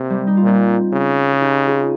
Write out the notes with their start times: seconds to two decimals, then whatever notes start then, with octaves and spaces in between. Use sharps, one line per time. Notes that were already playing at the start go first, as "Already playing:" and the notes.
Already playing: C3 A#3
0.10 G3
0.27 D#4
0.37 F4
0.43 A#2 C4 D#4
0.93 C#3
1.33 G#4
1.41 D#4 G4
1.67 F4 G#4